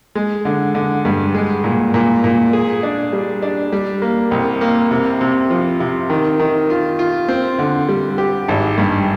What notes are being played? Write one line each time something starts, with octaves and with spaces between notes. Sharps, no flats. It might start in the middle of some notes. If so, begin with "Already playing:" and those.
G#3
D3
D3
G2
G#3
A#2
A#2
A#2
G#4
D4
G3
D4
G3
A#3
C2
A#3
C3
C3
F3
C3
D#3
D#3
F4
F4
C4
D3
G3
G4
G#1
G2